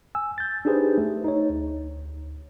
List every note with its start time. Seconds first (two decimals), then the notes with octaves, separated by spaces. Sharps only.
0.15 G#5 E6
0.38 G6 A6
0.65 D4 D#4 G4 G#4 B4 C5
0.98 A3
1.24 D#4 C#5
1.50 D2